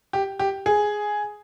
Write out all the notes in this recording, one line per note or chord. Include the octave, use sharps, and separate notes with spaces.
G4
G4
G#4